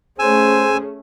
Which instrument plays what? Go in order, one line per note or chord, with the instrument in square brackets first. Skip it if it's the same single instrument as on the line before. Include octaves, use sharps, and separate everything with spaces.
[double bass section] A3 C#4 [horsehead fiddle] G#4 [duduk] C5 [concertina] G#5 E6